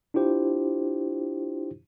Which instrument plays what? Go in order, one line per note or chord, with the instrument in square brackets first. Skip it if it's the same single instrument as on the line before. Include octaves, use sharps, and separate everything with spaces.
[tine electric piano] D4 E4 F4 G4 C5